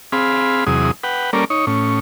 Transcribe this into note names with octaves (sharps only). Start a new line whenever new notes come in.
C4 G#4 F5 B5
E2 C3 F#3 G#4 D#6
B4 F#5 G5
G3 A#3 C#4 A4 A#4 D5
D#4 C#5
A2 C#4